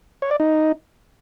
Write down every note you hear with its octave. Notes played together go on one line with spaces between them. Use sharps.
C#5
D5
D#4